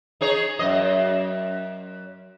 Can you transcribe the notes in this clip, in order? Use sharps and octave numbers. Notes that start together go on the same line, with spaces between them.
D#4 G#4 C#5
F#2 D#5